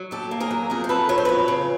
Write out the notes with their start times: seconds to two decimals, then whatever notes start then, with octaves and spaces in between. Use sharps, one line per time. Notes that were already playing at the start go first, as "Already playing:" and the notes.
Already playing: F#3
0.11 D#2 G4 A4
0.31 A#3
0.40 G#4 A#4
0.51 F#3
0.70 F2 G#4 A#4
0.84 C5
0.89 F2 A4 B4
1.09 F#3 C#5
1.18 C5
1.25 F2 B4 C#5
1.48 C#3